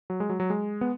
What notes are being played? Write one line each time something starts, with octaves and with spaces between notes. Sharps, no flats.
F#3
G#3
F#3
F#3
G#3
B3